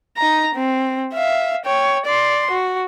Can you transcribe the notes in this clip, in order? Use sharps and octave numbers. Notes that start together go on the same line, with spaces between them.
D#4 A#5
C4
E5 F5
C#5 G5
D5 C6
F#4